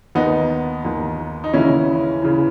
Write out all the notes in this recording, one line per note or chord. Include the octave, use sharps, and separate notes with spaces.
D#2 D#3 B3 D#4
D#2 D#3
D#4
D#2 C#3 E3 C#4 E4
C#3 E3